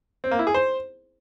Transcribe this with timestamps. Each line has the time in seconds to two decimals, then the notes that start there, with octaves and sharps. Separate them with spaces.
0.24 C4
0.31 A#3
0.39 E4
0.47 G#4
0.54 C5